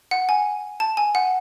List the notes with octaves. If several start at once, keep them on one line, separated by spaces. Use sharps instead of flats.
F#5
G#5
A5
G#5
F#5